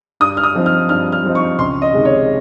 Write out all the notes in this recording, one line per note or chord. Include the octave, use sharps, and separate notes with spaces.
G2 D#6
F6
D#6
F3 C4 D#4
F6
G2 F6
F6
F3 C4 D#4
C#6
C#2 C6
D#5
C3 D#3 G#3
C#5